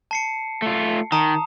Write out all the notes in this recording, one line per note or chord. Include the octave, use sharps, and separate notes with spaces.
A5 C7 C#7
A3 F4
D#3 A5 A#5 D#6